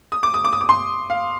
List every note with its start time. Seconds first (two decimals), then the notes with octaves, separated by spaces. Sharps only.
0.12 D#6
0.23 D6
0.34 D#6
0.44 D6
0.53 D#6
0.61 D6
0.69 C6
1.10 F5